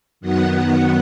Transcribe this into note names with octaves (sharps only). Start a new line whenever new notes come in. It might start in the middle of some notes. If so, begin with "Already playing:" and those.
F#2 D#3 F#3 B3 F#5